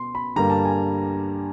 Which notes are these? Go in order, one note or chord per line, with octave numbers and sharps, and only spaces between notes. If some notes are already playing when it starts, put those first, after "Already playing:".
Already playing: B2 C6
B5
G2 D3 G3 A#3 A#5
A5
G#5